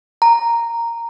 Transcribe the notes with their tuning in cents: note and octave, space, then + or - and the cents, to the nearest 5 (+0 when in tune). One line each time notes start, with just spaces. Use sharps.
A#5 -5